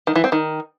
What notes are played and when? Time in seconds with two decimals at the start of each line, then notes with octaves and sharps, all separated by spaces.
0.07 D#3
0.15 E3
0.24 C4
0.32 D#3